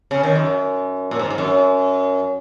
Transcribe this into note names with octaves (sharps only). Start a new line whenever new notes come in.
C#3
D#3
F#2
A#2
G#2
G#2
F#2